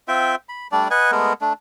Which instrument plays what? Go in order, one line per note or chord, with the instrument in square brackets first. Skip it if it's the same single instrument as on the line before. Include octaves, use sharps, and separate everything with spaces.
[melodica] C4 F4 E5 G5
B5
G3 A3 D4 D5
B4 D#5 F#5 G#5
G#3 A3 B3 A#4
A3 D4